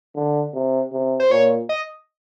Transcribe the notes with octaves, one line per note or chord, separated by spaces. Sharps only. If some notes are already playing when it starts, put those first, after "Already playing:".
D3
C3
C3
C5
A#2 C#5
D#5